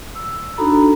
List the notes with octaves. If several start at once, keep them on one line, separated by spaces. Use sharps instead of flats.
E6
D4 D#4 F#4 A4 A#5 B5